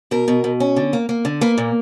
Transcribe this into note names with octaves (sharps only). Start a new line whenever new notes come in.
B2 A#4
B2
B2
C#4
D3
A#3
A#3
D3
A#3 B4
A#2